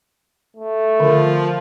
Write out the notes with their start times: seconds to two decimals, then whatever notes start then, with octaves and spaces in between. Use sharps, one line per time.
0.57 A3
1.00 D3 F3